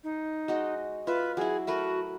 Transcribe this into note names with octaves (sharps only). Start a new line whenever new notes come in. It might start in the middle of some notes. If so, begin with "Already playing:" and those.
D#4
G#3 F#4 D#5
F4 B4 E5
F#3 E4 G#4
A3 F#4 A#4 B4